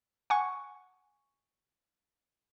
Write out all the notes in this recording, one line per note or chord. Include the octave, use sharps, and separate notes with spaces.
F#5 G#5 C#6